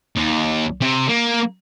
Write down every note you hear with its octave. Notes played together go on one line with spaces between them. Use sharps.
D#2
C3
A#3